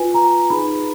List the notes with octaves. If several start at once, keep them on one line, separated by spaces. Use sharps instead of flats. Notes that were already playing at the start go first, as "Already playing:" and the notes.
Already playing: F4 B4 G#5
A#5
D#4 G#4 B4 B5